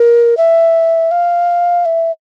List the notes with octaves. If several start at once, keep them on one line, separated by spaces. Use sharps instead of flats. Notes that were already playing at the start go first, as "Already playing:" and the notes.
Already playing: A#4
E5
F5
E5